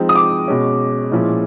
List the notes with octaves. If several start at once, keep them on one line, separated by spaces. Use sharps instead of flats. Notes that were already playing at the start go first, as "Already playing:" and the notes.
Already playing: F3 G#3 C4 D#4
D#6
D6
B2 G#3 C#4
A#2 F3 G#3 C#4 E4